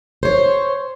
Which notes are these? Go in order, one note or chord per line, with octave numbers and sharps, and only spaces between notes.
C5 C#5